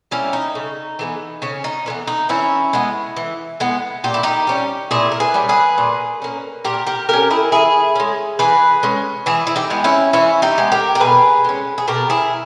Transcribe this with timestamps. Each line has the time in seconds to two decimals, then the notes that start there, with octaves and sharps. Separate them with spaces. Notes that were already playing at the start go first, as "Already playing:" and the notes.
0.11 G3 A#3 C#4 E4
0.33 D#4
0.55 C#3
0.99 E3 G#3 B3
1.42 C#3 C#4
1.64 D#4
1.86 E3 G#3 B3
2.07 D#4
2.29 E3 C#4 E4
2.73 G#3 B3
3.17 E3
3.60 G#3 B3
4.04 A#2 G4
4.14 E4
4.23 D#4 G4
4.47 G3 C#4
4.91 A#2 E4 G#4
5.11 A#4
5.20 G#4 B4
5.34 G3 C#4
5.49 G#4 B4
5.78 A#2
6.22 A#3 C#4
6.64 A#2 G4 A#4
6.87 G4 A#4
7.09 A#3 G4 A#4
7.13 C#4
7.30 E4 G#4
7.52 E3 E4 G#4
7.95 G#3 C#4
8.39 E3 G#4 B4
8.83 G#3 C#4
9.26 E3 E4 G#4
9.47 E4
9.56 D#4 G4
9.70 G#3 B3
9.84 C#4 E4
10.13 E3 C#4 E4
10.42 D#4 G4
10.58 G#3 B3
10.72 G4 A#4
10.95 A#4
11.00 B2 G#4 B4
11.44 G#3 C#4
11.78 G#4
11.87 B2 G4 A#4
12.10 E4 G#4